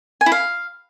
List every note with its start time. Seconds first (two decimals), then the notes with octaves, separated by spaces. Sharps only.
0.21 G#5
0.26 E4
0.32 F5